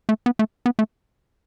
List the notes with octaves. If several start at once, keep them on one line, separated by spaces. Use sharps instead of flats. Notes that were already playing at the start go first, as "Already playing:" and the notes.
A3
B3
A3
B3
A3